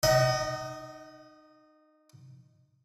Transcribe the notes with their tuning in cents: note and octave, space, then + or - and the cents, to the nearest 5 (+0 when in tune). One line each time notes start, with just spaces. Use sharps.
D#4 -20 D#5 +25 F#5 +35